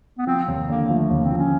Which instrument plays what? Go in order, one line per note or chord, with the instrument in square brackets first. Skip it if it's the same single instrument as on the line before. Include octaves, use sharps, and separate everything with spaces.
[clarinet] B3
[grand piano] F3 [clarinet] C4
[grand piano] D#2
[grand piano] D3 [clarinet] A#3
[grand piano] F3 [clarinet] A3
[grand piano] D#2 [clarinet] A#3
[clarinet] C4
[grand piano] F3
[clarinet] C#4